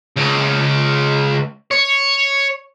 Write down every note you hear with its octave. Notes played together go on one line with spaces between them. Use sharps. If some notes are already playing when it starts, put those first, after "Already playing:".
C#2
C#5